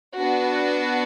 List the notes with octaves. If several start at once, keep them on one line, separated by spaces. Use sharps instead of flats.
B3 D4 F#4